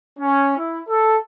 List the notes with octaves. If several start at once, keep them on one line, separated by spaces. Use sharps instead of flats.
C#4
E4
A4